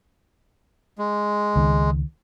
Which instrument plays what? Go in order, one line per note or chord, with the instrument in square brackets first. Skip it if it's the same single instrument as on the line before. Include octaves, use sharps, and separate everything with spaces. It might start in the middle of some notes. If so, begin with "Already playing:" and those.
[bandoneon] G#3
[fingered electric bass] C#2 D#3